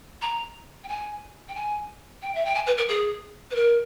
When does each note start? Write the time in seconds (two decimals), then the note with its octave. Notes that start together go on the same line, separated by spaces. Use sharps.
0.22 A#5
0.84 G5
0.88 G#5
1.48 G5
1.55 G#5
2.22 G5
2.35 E5
2.45 G5
2.55 G#5
2.66 B4
2.77 A#4
2.88 G#4
3.51 B4
3.55 A#4